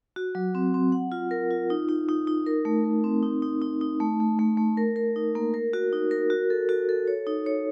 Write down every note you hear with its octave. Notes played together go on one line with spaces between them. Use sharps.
F#4
F#3
C4
C4
F#5
F4
A#4
F4
D#4
D#4
D#4
D#4
A#4
A3
A#4
C4
D#4
D#4
D#4
D#4
A3
A3
A3
A3
A#4
A#4
D#4
A#3
A#4
F#4
D#4
A#4
F#4
A4
F#4
A4
C#5
D#4
C#5